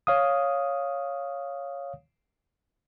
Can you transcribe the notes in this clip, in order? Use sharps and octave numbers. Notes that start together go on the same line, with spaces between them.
C#5 F5 D#6